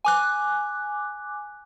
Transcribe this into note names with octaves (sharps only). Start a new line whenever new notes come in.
G#5 D6 F#6